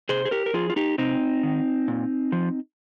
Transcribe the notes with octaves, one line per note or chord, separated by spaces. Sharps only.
C3 G#4 C5
G#4
G4 A#4
A#4
F3 F4 G#4
F4
D#4 G4
C3 C4 D#4
D#3
A#2
F3